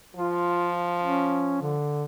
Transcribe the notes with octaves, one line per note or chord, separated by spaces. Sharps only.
F3 F4
C#4
D3